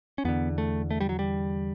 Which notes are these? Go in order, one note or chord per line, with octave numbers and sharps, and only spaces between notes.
C#4
E2 D3 B3
A3
A3
G3
F#3
G3